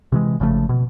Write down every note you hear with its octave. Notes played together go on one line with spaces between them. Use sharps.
C3 E3 G#3
G#1 C#3 F3 A3
B2